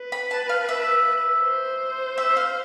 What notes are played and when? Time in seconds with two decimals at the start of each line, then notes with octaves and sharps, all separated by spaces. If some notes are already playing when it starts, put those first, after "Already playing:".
Already playing: B4
0.12 B5
0.31 A5
0.49 F5
0.69 E5
1.43 C5
2.18 E5
2.37 F5